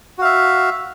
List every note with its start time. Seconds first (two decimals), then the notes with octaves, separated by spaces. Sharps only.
0.18 F#4
0.21 F5
0.25 E5